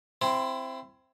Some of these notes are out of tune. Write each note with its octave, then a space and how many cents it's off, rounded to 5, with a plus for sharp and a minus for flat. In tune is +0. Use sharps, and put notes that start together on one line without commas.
C4 +0 E4 +25